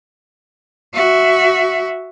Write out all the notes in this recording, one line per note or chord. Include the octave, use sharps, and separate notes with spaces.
F#4 E5